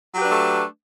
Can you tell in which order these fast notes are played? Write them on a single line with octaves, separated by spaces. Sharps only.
F#3 G4 B4 D4 A3